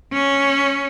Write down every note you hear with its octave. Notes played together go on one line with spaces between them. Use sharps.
C#4